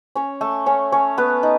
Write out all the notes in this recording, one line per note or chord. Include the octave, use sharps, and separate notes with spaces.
C#4 C#5
A3 A4
C#4 C#5
C#4 C#5
B3 B4
D#4